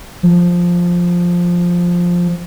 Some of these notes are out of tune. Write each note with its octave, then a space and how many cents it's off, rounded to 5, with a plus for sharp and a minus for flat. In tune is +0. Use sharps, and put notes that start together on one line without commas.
F3 +5